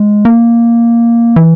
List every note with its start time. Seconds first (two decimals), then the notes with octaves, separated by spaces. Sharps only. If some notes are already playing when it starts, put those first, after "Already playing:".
Already playing: G#3
0.25 A#3
1.36 E3